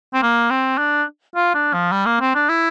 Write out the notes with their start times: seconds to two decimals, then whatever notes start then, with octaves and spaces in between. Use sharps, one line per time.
0.14 C4
0.22 A#3
0.50 C4
0.78 D4
1.35 F4
1.54 D4
1.73 F3
1.92 G3
2.06 A#3
2.20 C4
2.35 D4
2.49 E4